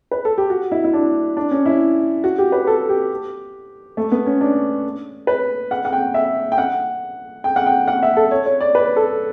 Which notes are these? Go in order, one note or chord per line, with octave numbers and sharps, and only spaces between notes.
B4
A4
G4
F#4
E4
E4
D4
D4
C#4
E4
F#4
G4
B4
A4
G4
A3
B3
C#4
D4
B4
F#5
F#5
G5
E5
G5
F#5
G5
F#5
G5
F#5
E5
A4
C#5
C#5
D5
B4
A4